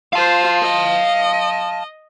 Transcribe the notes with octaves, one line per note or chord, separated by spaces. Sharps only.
F4 C5 F5 A5
D#5